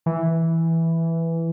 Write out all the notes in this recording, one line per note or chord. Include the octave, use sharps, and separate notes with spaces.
E3